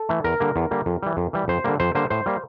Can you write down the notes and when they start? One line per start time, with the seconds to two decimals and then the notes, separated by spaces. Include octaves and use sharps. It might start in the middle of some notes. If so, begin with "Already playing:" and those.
Already playing: A4
0.09 E3 A3
0.24 E2 A#4
0.40 D3 G3 A#3
0.56 E2
0.71 D3 G3 A#3
0.86 F2
1.02 E3 G3
1.17 F2
1.33 E3 G3
1.48 F2 C5
1.64 D3 G3 A#3
1.80 F2 C5
1.95 D3 G3 A#3 C5
2.10 A2 C5
2.26 G3 A#3